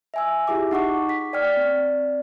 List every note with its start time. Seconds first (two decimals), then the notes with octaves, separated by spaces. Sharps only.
0.14 E5 G#5 E6
0.47 E4 F4 G4 G#4 E5 D6
0.71 D#4 F#5 C#6 D6
1.09 B6
1.33 D5 G5 F6
1.56 C4 D5